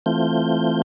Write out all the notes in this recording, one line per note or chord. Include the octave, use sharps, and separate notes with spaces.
E3 A3 C4 F4 G6